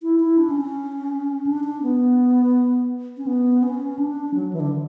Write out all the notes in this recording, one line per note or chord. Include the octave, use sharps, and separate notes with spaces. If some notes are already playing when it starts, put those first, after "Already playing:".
E4
E4
D4
C#4
C#4
D4
D4
B3
C#4
B3
C#4
D4
F#3
E3
D3